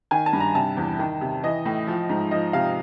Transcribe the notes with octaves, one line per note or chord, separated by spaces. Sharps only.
D#3 G#5
A5
G2
A#5
C3 A5
E2
D#3
C3
E3 D#5
A2
F3
G#2
F3 D#5
C3 F5